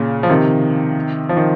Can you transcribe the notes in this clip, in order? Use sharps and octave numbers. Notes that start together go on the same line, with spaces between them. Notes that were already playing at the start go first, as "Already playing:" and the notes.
Already playing: A#2 C#3
F3
C3 D#3
F3
D#3